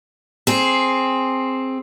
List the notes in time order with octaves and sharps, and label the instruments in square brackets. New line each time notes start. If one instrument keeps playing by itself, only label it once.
[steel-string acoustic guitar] C4 G#4